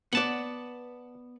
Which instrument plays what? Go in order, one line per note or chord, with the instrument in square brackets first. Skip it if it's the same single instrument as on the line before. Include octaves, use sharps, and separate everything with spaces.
[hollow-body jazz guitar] B3 D5 [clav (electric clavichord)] F#5 A5